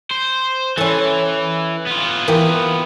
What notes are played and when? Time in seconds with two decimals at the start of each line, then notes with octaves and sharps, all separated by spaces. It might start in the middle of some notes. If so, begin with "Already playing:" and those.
0.11 C5
0.78 E3 C#4 A4
1.87 B3 F4
2.28 E3 A#3 G4